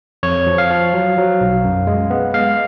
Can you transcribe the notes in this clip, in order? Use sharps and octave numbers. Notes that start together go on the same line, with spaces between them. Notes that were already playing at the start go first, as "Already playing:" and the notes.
F2 C#5
F3
F5
F3
F#3
F#3
B1
F#2
G#3
B3
G#3 F5